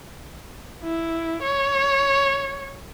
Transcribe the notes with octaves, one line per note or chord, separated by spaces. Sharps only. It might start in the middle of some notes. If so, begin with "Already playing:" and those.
E4
C#5